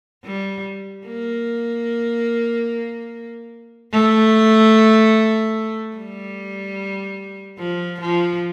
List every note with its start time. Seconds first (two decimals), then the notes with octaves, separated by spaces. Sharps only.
0.25 G3
1.07 A#3
3.92 A3
5.96 G3
7.59 F3
8.01 F3